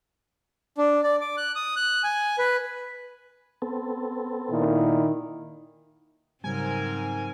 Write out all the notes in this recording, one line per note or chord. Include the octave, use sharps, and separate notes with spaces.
D4
D5
D6
F#6
D#6
F#6
G#5
B4
B3 C4 A4
A#2 D#3 E4
G#2 C#3 F#3 G3 C4 A#4 G#5